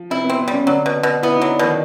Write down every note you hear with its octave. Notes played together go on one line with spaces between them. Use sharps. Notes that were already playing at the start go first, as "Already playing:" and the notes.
Already playing: F3
C3 C4 E4
B3
C4
B3
G3
C#3 C#4
D3 F#3 D4
B2
B2
B3 E4
D#4
F#3
D4
B2 D#3 D#4